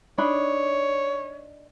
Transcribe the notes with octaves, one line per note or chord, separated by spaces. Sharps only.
D4 D#4 C#5 B5